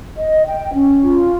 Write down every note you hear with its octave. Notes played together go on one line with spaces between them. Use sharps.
D#5
G5
C#4
F4